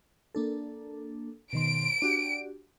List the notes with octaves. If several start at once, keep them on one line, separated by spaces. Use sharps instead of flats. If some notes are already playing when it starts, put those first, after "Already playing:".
A#3 D4 A4
B2 D#3 C6 D7
D4 F#4 G4